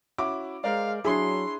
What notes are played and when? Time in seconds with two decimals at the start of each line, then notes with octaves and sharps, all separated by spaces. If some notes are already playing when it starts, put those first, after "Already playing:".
0.18 C#4 E4 F#4 D6
0.64 G#3 A#4 C5 D5 F5
1.05 F#3 D4 E4 G#4 C#5 C6 C7